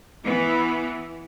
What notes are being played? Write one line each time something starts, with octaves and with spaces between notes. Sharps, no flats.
E3 B3